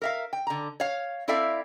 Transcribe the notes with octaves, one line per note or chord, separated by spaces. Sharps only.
A#4 E5 F5
G5
D3 A#5
C#5 F5
C4 E4 A4 D5 E5 F5